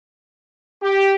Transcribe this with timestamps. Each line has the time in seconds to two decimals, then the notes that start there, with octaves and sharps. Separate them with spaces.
0.82 G4